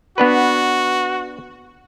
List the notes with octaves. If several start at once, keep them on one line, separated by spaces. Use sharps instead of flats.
B3 D4 F#4 B4